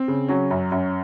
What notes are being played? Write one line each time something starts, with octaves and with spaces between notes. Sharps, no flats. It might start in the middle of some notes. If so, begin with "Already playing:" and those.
Already playing: C4
C#3
F#3 C#4
F#2
F#2